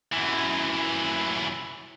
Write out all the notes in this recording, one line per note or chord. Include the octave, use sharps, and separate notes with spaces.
F#2 E3